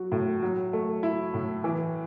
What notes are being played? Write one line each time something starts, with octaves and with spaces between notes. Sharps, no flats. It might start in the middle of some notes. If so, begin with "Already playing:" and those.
Already playing: F#3 F#4
A2
F#3
A3
E4
A2
E3